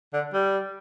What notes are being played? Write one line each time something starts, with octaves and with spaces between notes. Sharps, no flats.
D3
G3